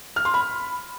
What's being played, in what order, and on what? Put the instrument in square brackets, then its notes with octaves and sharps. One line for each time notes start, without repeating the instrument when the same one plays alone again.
[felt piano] F6
C6
B5